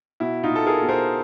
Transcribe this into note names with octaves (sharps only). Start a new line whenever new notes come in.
B2 E4
D#4 F4
B2
A4
G#4 A#4
B2
A#4 C5